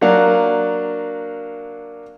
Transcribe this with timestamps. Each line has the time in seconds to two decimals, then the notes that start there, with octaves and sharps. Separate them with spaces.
0.01 F#3 A#3 D4 F5 F#5